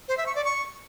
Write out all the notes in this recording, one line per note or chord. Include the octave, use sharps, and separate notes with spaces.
C5
E5
C#6
D5
C#6